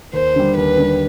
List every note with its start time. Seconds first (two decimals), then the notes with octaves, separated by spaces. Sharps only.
0.13 D#2 C5
0.36 D3 G3
0.56 D#2 B4
0.77 D3 G3